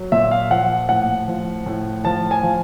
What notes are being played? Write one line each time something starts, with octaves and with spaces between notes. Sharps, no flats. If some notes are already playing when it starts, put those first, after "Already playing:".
Already playing: F#3
A#2 E5
F5
F3 F#5
A2 F#5
F3
A2
F3 A5
G#5
F3